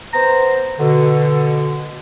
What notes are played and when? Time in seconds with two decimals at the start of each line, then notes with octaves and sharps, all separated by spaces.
0.14 B3 C5 A#5
0.80 B2 D3